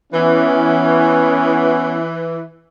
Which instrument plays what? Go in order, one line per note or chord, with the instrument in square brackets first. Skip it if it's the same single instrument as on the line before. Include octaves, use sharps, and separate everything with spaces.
[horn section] E3 [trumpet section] B3 C#4